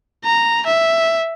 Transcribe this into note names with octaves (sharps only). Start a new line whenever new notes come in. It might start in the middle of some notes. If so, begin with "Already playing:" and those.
A#5
E5